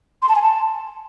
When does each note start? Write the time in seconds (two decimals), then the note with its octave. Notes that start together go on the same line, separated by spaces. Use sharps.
0.22 C6
0.29 A5
0.36 G#5
0.42 A5